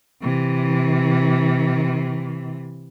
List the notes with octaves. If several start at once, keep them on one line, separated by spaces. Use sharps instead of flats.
C3 E3